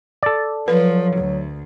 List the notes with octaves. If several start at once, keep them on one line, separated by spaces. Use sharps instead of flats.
A4 D5
F3 F#3 B4
D2